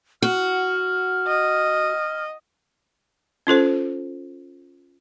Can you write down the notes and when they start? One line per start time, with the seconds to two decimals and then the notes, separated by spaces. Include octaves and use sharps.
0.22 F#4 F6
1.27 D#5
3.47 C#4 F4 A4 C5